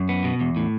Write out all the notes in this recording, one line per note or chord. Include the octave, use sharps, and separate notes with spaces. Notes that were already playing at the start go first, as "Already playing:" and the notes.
Already playing: F#2
B3
B2
E2
A2